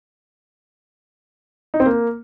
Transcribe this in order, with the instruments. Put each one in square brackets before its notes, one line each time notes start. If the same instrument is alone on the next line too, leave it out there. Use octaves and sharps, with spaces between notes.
[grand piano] D#4
C4
A#3